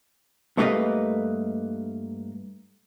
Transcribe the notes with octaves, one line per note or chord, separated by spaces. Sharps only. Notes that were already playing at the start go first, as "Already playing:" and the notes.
G2 A3 A#3 E4 B4 D#5